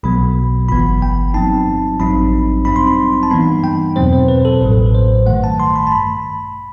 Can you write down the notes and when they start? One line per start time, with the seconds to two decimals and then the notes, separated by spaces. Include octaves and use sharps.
0.03 B1 B2 F#3 B3 B5
0.69 G1 G2 E3 B3 B5
1.02 G5
1.34 G2 F#3 C4 D#4 A5
2.00 A1 G2 F#3 C4 D#4 B5
2.65 G2 F#3 C4 D#4 B5
2.76 C6
2.87 B5
3.23 A5
3.31 G2 E3 B3 D#4 B5
3.64 G5
3.96 E2 B2 F#3 C4 C5
4.13 C5
4.28 B4
4.45 A4
4.61 A1 A2 F#3 B4
4.95 C5
5.26 G2 D#3 A3 F#5
5.44 A5
5.60 C6
5.76 B5
5.87 A5
5.92 B5